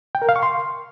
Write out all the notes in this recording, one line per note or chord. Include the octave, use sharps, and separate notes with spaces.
G5
A#4
F5
C#6
C6